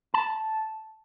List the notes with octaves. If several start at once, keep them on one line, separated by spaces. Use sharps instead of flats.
A5